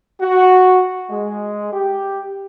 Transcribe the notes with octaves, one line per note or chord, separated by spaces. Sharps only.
F#4
G#3
G4